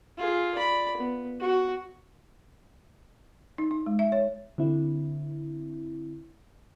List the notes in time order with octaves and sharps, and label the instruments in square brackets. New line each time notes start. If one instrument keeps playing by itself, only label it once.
[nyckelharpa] F4 G#4
D5 B5
B3
F#4
[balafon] D#4
D#4
G#3
E5
C#5
[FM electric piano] D3 C4 E4